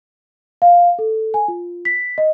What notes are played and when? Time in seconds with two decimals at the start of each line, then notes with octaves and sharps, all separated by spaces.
0.62 F5
0.99 A4
1.34 G#5
1.48 F4
1.85 B6
2.18 D#5